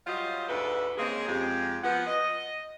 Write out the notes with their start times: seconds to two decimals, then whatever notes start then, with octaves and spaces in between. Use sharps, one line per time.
0.07 F#3 G3 F4 C5 D#5 F5
0.48 D2 G#2 D4 A4 B4 E5
0.98 C#3 G#3 A#3 C4 G#4
1.28 F2 G#3 G4
1.84 F3 B3 F#5
2.07 D#5